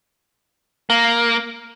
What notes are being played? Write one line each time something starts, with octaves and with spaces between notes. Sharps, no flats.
A#3